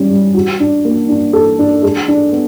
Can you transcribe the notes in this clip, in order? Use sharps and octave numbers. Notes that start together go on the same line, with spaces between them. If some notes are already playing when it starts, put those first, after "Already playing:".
Already playing: G3 C#4
G3
F#4
D4
A#3
D4
A4
D4
G#3
D4
B3